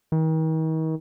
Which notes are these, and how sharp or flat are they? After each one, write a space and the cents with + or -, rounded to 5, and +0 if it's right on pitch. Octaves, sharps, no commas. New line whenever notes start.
D#3 +40